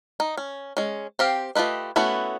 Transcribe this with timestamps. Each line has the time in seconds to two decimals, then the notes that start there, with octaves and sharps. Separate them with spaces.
0.20 D#4
0.37 C#4
0.77 G#3 C#4
1.19 C4 G4 F5
1.55 A3 F4 G4 B4 D#5
1.96 A3 B3 C#4 E4 F#4